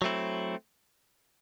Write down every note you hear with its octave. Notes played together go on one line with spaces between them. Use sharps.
F#3 A3 C4 E4